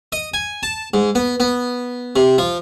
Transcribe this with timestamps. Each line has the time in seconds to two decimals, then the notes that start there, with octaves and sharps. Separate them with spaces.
0.12 D#5
0.34 G#5
0.63 A5
0.94 G#2
1.15 B3
1.40 B3
2.16 C3
2.38 F3